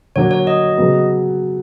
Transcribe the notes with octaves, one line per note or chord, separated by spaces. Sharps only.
D3 F#3 A#3 D4 C#5
C#5
D#5
C#3 F#3 B3